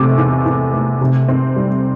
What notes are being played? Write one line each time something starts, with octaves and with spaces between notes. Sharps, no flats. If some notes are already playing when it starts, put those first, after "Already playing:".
Already playing: E2 C3 A3 D6
E2
E2
A3
C3
C4
G3